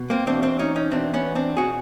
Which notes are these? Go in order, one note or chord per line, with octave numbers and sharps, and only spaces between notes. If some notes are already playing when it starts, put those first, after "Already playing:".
Already playing: B2
A#3 C4
E2 B2 C4 D4
C4 D4
C#4 D#4
C#4 D#4
E2 B2 C4 D4
B3 C#4
C4 D4
B2 F#4 G#4